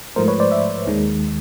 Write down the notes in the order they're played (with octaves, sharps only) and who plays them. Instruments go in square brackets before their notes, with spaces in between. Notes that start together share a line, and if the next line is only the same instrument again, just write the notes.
[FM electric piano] G#2 F3 A3 A#4 C5
B4 C#5
C5 D5
D5 E5
D#2 D#3 G#3